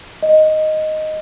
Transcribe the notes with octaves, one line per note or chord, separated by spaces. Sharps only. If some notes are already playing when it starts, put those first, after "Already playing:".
D#5